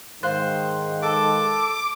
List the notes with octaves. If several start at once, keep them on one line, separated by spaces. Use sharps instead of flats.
G#2 D#3 C5 F5 C6 F#6
A4 D6